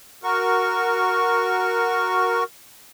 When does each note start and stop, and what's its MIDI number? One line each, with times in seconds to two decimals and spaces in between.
0.23 2.44 66
0.23 2.44 70
0.23 2.44 85